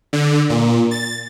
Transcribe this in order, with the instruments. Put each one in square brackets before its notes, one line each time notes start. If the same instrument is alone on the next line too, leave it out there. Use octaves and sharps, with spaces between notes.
[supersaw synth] D3
A#2
A6